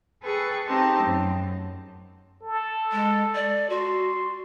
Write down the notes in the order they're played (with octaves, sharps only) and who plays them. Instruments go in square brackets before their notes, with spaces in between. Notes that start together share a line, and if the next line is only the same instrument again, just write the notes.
[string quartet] G#4 A4 B4 G5 C#6
C4 D#4 G4 A5
F#2
[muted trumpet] A4
[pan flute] G#3
D5
[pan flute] F#4 [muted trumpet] C6